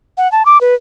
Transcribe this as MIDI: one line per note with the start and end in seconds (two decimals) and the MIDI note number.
0.18 0.30 78
0.32 0.45 81
0.46 0.60 86
0.61 0.75 71